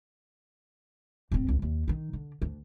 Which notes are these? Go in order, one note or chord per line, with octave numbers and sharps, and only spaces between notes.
D1 C4
C#2
D#2
D#3 D#4
D3
D2